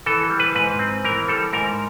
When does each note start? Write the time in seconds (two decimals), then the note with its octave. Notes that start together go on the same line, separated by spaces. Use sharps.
0.06 E3 A4
0.30 G3
0.39 B4
0.55 G#2 B4
0.79 C4
1.04 E3 A#4
1.28 G3 A4
1.53 G#2 A#4